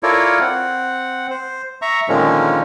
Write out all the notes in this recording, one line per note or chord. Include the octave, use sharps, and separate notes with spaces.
E4 F4 A4 A#4 C#5 D5
C4 F#5
C5
E5 A#5 C#6
A#2 D3 D#3 F3 G#3 C#4